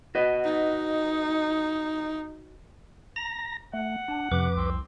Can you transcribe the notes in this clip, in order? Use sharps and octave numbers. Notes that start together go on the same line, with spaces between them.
F#4 B4 D#5
D#4
A#5 A#6
A3 F#5
D4
F2 C3 B4 D6
C2 C4